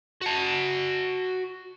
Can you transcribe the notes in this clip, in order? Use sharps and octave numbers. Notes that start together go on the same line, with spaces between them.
F#4 A5